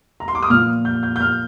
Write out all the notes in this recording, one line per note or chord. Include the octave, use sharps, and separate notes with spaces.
A#5
C6
D6
D#6
A#2 F3 F6
G6
G6
G6
F6